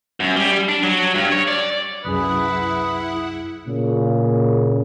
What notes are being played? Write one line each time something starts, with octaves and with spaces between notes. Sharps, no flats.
F#2
G3
D4
F#3
G2
C#5
D5
C2 F#2 E4 G#4 B4 F#5 D#6
A#2 C#3